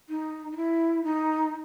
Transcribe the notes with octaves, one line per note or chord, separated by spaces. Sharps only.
D#4
D#4
E4
D#4